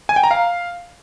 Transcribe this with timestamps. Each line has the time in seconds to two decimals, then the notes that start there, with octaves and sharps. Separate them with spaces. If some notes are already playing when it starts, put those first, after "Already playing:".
0.09 G#5
0.16 G5
0.24 A#5
0.31 F5